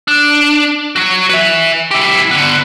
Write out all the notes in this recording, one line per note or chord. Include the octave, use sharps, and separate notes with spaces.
D4
F#3 F#4
B4 E5
E4 G4
D3 B3